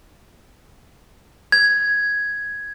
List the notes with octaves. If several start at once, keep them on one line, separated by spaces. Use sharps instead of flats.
G#6